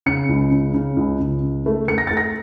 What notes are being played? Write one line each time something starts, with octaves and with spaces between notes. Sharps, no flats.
C#3 C#7
C#2
C#3
C#3
C#2
C#2
C#3
A3
A3 C#7
A#6
A3 A6
A#6